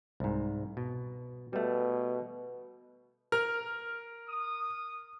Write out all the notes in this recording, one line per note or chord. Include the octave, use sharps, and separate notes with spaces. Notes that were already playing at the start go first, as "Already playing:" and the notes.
C2 G#2
B2
B2 G3 A3
A#4 F6
D#6